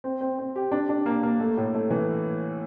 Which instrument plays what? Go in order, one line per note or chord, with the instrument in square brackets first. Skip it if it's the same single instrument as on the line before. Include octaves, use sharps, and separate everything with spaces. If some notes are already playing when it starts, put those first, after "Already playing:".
[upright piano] C4
C4
C4
G4
D4
D4
A#3
A#3
A3
A2
A3
E3